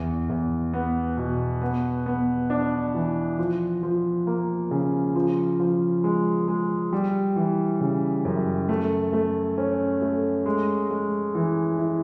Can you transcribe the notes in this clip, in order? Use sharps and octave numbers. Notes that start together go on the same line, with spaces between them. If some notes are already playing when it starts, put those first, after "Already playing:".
Already playing: E2
E2
B3
B2
B3
B3
D4
E3
F3
F3
A#3
C#3
F3
F3
G#3
G#3
G3
E3
C#3
F#2
A3
A3
C#4
A3
G#3
G#3
E3
E4